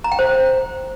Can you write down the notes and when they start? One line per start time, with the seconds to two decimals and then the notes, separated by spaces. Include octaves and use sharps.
0.04 A#5
0.12 G5
0.19 C5